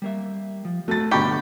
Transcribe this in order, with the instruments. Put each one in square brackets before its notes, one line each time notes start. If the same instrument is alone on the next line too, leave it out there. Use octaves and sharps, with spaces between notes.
[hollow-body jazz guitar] G3 A#3 E5
F3
[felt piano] A3 A6 [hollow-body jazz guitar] F#4
[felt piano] G1 B5 C#6 [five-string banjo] G4